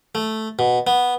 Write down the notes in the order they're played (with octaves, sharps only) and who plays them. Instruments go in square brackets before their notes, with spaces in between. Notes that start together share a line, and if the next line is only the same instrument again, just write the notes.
[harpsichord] A3
B2
B3